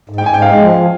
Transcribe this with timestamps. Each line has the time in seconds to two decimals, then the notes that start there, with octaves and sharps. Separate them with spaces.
0.09 G#2
0.18 G5
0.26 G#2 G#5
0.34 G5
0.42 G#3 F5
0.58 F3
0.75 F3